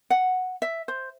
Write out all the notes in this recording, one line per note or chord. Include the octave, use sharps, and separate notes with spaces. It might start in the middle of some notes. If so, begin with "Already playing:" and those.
F#5
E5
C5